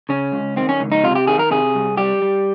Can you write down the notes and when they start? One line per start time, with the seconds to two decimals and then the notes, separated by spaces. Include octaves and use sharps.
0.09 C#3 C#4
0.32 C#2
0.56 D#3 C4
0.69 C#4
0.80 C#2
0.92 D#4
1.04 C3 F4
1.15 G4
1.27 D#3 G#4
1.39 A#4
1.51 C3 G#4
1.75 C2
1.97 G3 G4
2.22 G3